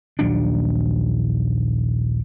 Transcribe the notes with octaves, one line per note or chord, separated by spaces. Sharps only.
A#1 D#2 F#3 D4